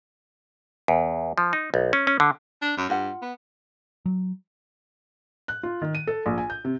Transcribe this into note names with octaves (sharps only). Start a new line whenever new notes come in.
E2
F3
D#4
B1
C#4
C#4
D3
D4
F#2
G2 F4 F#5
B3
F#3
F#6
F4
D#3
D#7
A4
A#1
G#5
G6
C3